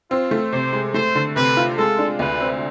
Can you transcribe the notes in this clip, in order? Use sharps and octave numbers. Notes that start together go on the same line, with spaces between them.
C4 F4
A3
C3 C5
G#3
A3 C5
D3
C3 B4
F4
G#3 A4
D4
D2 B4
C4